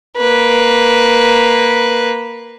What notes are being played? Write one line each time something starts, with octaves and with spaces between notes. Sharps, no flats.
A#3 B4